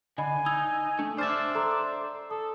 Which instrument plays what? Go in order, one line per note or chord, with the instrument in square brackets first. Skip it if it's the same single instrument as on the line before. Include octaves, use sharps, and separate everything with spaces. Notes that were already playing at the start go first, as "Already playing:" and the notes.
[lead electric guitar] D3 [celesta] D#5 B5 [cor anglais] G#5
[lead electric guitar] D#4 [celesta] E6 G#6
[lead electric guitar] A3 [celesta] D4
[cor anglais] D4 [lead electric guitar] C5 E5 [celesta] F6 A6
[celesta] A4 A#5 C6
[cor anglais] A4 [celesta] D#6